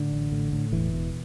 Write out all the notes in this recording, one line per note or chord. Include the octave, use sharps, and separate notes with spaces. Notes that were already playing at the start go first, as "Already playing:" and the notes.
Already playing: A2 D3
A1
A2
A2
E1 E3
B2